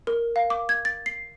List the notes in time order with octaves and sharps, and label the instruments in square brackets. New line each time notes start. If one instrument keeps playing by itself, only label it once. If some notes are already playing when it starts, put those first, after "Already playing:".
[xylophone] A#4
F5
D6
G#6
A6
C7